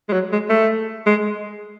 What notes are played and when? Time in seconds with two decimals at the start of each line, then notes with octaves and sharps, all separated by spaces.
0.09 G#3
0.13 F#3
0.32 G#3
0.50 A3
1.06 G#3